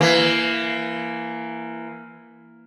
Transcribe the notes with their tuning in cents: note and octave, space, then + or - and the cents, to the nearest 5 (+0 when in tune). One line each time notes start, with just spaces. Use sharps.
E3 +20 A#3 +0